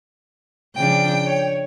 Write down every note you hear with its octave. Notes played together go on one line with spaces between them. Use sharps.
C#3 F3 D4 G5
C#5